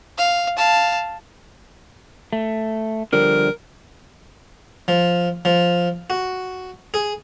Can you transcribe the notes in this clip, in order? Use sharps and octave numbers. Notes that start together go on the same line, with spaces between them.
F5
F5 A5
A3
D3 F3 G3 A#4
F3
F3
F#4
G#4